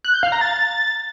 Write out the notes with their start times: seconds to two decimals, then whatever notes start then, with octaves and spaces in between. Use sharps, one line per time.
0.04 F#6
0.14 G6
0.23 F5
0.32 A#5
0.41 A6